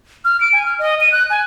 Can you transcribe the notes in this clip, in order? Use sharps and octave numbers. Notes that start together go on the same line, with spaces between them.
F6
D7
G#5
F6
D#5
D#7
F#6
G#5